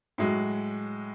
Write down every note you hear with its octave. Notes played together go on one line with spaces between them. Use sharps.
A2 F#3 G#3